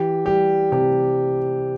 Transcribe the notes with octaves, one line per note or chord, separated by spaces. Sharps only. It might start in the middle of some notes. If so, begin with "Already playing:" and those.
Already playing: E3 G4
G3 G4
C3 G4